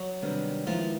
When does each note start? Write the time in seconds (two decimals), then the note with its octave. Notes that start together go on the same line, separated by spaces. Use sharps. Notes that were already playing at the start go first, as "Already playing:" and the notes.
Already playing: F#3 F#4
0.22 C3 D#3 G3 B3 D4
0.67 D#3 F3 G#3 B3 E4 F4